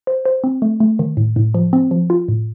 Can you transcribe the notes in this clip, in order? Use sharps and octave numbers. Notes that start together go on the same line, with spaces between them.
C5
C5
C4
A3
A3
D#3
A2
A2
F3
C4
F3
F4
A2